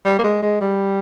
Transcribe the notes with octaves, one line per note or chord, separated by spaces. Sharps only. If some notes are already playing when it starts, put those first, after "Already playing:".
G3
A#3
G#3
G#3
G3